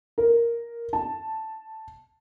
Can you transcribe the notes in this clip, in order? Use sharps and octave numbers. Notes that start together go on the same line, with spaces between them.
A#4
A5